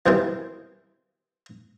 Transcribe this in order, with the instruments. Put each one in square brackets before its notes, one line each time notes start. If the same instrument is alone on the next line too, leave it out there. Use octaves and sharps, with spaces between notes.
[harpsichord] F#2 D#3 E3 G3 C4